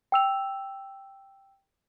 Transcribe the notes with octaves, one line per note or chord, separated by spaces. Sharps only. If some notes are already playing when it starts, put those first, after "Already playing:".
G5 E6 F7